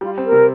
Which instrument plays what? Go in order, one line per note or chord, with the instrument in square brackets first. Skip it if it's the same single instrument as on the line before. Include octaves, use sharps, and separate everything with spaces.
[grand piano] G3 [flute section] F4
[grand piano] C4
[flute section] A#4
[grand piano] C3